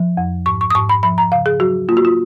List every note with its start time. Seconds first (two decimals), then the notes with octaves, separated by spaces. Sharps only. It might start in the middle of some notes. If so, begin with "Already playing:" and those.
Already playing: F3
0.17 F2
0.46 G#2 C#6
0.61 C#6
0.70 D#6
0.75 G#2 C#6
0.89 B5
1.03 F3 B5
1.18 A#5
1.32 C#3 F5
1.46 G#4
1.60 F#3 F#4
1.89 A#3 F4
1.97 F#4
2.05 F4